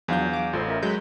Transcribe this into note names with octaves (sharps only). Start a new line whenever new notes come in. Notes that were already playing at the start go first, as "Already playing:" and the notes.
E2 F3 F#3 D4 F5 G6
D6
A1 F4 A4 C5
C#4 A#4 E5
F#3 G#3 B5 G6